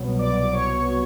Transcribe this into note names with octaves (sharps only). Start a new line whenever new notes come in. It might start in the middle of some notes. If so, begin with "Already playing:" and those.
Already playing: C2 B2 F#3 B3
D5 D6
D6
C#5 C#6